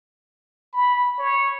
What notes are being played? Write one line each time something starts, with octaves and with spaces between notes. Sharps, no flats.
B5
C#5